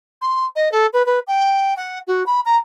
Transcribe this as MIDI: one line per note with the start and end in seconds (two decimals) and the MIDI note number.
0.21 0.44 84
0.56 0.71 75
0.72 0.86 69
0.93 1.05 71
1.06 1.19 71
1.27 1.74 79
1.77 1.99 78
2.07 2.23 66
2.26 2.40 83
2.45 2.56 82